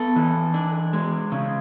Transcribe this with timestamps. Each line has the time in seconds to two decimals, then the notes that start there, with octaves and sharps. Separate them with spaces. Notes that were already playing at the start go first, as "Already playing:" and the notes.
Already playing: B3 A4
0.16 E3
0.54 D4
0.93 G#3
1.32 C#3